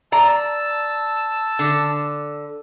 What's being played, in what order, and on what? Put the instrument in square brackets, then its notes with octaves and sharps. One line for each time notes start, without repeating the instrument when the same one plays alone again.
[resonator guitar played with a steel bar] D5 A#5 [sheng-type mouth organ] A5 E6
[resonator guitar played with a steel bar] D3